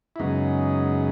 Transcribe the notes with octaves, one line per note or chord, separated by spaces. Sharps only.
E4
F#2 C#3 G#3 B3 D#4